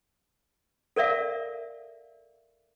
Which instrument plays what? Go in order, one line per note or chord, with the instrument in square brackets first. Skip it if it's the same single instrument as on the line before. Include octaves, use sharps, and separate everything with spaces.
[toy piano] A4 A#4 D5 E5 F5